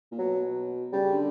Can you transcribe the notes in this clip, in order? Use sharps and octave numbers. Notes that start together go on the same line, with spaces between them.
A#2
B2 F#3
C#3 G3
D3